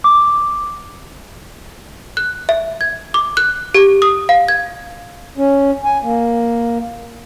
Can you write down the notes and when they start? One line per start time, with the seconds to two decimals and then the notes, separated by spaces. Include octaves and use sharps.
0.04 D6
2.17 F#6
2.49 E5
2.81 G#6
3.14 D6
3.37 F#6
3.74 G4
4.02 D#6
4.29 F5
4.48 G#6
5.38 C#4
5.85 G#5
6.03 A#3